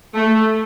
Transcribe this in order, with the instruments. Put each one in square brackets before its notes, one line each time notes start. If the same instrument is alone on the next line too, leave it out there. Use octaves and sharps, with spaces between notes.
[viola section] A3